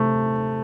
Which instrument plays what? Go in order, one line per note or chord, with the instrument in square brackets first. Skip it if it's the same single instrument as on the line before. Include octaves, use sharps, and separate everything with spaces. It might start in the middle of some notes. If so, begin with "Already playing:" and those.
Already playing: [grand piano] C3 A3